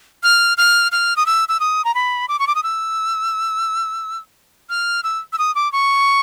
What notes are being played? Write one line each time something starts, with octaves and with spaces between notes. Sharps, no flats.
F6
F6
F6
D#6
E6
E6
D#6
A#5
B5
D6
C#6
D6
D#6
E6
F6
E6
E6
D#6
D6
C#6